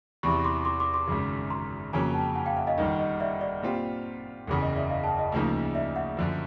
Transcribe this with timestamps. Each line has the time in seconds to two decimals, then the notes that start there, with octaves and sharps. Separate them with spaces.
0.23 E2 C3 E3 B5 C#6
0.45 C6 D6
0.65 C6 D6
0.80 C6 D6
0.94 C6 D6
1.07 G#1 F#2 C#3
1.50 A#5 C6
1.93 F2 C#3 F#3 A#3 C#4 G#5 A#5
2.14 G5 A5
2.35 F#5 G#5
2.46 F5 G5
2.56 E5 F#5
2.67 D#5 F5
2.78 G1 G2 D#3 D#5
2.99 D#5
3.20 D5 E5
3.41 D5
3.62 A#2 G3 C4 F4
4.47 F#1 E2 C#3
4.62 D#5
4.76 D5 E5
4.90 D#5 F5
5.04 G5 A5
5.19 D#5
5.32 D2 C#3 F3 A#3 D#4
5.74 D5 E5
5.96 E5 F#5
6.17 F#2 D3 F3